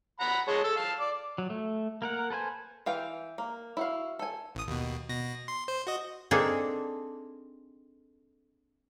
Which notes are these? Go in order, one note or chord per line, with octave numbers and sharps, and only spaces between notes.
F#5 A#5 B5
G#3 C#5 A5
A4 A5 E6
F5 A5
D5
F#3
A3
A#3 A#4 F#5
A4 B4 C5 G#5
E3 F5 G5
A#3
E4 F#4 F5
A4 G#5
A1 D#6
D#2 B2
B2 A#6
C6
C5
F#4 D#5
A#3 C4 D4 D#4 G#4 A4